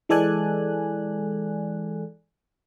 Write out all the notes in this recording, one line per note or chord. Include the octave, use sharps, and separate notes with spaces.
E3 G#3 A4 D5 G#5 F#6